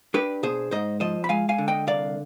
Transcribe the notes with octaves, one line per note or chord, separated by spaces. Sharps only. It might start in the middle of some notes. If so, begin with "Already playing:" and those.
D4 G4 B4
B2 G#4 C5
G#2 C5 D#5
F3 C5 D#5
B5
G#3 F5 G#5
F5 G#5
D3
D#5 G5
C2 D5 F5